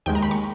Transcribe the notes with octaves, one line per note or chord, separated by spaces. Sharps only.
D#2 D#3 G#3 G5
A#5
B5
C#6